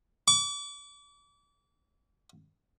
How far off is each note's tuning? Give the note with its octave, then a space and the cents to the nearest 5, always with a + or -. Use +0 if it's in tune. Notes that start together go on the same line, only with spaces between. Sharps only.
D6 -40